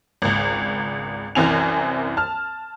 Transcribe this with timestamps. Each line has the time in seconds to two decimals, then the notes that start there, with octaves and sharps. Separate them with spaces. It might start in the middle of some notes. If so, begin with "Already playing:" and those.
0.22 G#1 C#2
1.35 C2 F#2 E3 C4 G#5 F7
2.17 A5 F6